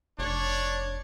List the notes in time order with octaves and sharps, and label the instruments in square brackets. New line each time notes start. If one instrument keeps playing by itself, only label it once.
[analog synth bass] F1 [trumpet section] D4 C#5